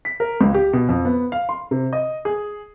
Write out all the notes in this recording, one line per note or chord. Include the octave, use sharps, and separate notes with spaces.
B6
A#4
C#2
G4
B2
F2
B3
F5
C6
C3
D#5
G#4